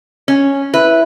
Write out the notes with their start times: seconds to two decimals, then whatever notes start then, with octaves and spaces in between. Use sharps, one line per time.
0.28 C#4
0.74 E4 B4